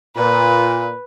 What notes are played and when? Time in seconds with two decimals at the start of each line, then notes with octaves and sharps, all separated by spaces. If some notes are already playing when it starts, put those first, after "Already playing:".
0.16 A#2 B4